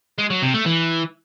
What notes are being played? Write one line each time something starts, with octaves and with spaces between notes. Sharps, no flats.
G#3
F#3
C3
A3
E3